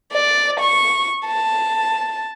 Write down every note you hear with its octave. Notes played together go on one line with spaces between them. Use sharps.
D5
C#6
A5